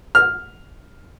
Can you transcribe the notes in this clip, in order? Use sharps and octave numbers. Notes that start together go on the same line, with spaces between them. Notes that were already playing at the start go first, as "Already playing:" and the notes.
F6